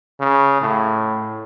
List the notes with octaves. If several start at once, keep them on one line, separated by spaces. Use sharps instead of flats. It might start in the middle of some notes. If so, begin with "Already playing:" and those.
C#3
A2